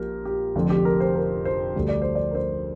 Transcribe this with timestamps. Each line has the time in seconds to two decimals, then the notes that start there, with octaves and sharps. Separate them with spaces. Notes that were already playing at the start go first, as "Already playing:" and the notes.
Already playing: A#1 A#2 F3 G4 A#4
0.25 G4
0.55 F1 F2 D3
0.70 G4
0.85 A#4
1.00 C5
1.15 A#4
1.45 C5
1.75 D2 D3 G3
1.89 D5
2.02 C5
2.15 D5
2.31 A#4
2.35 C5